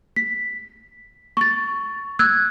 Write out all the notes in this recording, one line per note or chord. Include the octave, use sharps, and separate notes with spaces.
B6
C#6 A6
E6 F#6 G#6